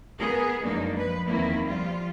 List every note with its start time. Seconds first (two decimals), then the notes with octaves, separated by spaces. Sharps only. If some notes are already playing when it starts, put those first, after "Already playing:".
0.19 B3 G#4 A#4
0.63 F#2 F3 G#3 A#3 D4 D#4
0.97 F3 B4
1.28 E2 D#3 A#3 C4 E4
1.68 F3 G3 F4